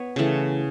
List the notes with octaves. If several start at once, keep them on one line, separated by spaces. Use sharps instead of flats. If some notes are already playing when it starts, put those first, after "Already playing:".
Already playing: B3 C#5
C#3 E3 A3